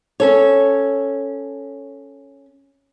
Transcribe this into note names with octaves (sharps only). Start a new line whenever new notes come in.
C#4 A4 C#5